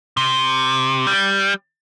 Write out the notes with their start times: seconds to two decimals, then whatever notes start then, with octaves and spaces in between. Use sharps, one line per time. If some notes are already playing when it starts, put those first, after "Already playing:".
0.17 C3
1.07 G3